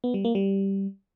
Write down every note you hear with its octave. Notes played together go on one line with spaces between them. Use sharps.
B3
G3
A#3
G3